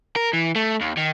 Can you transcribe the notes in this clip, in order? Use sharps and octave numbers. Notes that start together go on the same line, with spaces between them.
A#4
E3
A3
D#2
D#3